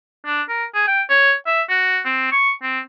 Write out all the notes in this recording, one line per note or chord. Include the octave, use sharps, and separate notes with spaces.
D4
A#4
G#4
G5
C#5
E5
F#4
C4
C#6
C4